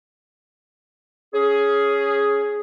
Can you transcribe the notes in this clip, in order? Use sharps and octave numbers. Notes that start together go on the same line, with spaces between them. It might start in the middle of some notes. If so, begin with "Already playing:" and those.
C#4 G#4